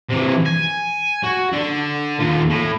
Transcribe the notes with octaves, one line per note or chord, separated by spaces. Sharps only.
C3 E3
G#5
F#4
D3
D#2 F4
A2